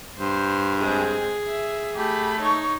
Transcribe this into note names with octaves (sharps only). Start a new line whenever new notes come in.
G2 C5
G#3 C4 G#4
E5
A3 G4 B5
D#4 C#5 C#6